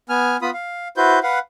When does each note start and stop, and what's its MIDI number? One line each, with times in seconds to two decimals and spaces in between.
0.09 0.37 59
0.09 0.37 80
0.09 0.37 89
0.42 0.50 59
0.42 0.50 65
0.42 0.50 83
0.42 0.50 87
0.54 0.88 77
0.97 1.19 64
0.97 1.19 66
0.97 1.19 71
0.97 1.19 72
0.97 1.19 91
1.23 1.39 71
1.23 1.39 77
1.23 1.39 78